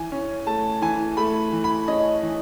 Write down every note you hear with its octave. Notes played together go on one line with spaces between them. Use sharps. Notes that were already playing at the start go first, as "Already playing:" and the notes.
Already playing: E3 G#5
C#4
A3 A5
E3 G#5
A3 B5
E3
B5
C#4 D#5
E3